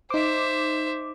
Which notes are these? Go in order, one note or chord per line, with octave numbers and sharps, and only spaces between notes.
D#4 C5 E5 D6